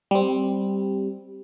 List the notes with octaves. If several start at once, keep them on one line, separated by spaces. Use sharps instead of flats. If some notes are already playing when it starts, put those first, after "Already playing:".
G3 C4